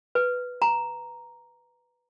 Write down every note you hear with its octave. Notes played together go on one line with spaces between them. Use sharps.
B4
A#5